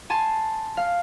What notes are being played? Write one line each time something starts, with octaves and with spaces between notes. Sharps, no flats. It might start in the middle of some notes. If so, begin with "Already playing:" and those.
G#5 A5 C6
F5